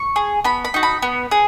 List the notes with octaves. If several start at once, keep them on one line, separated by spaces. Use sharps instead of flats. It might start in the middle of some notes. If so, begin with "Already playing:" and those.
Already playing: C#6
G#4
B3 B5
B5
D#4 F#4
B5
B3
G#4